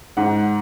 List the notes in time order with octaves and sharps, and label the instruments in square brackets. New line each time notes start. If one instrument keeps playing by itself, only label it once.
[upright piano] G#2 F#5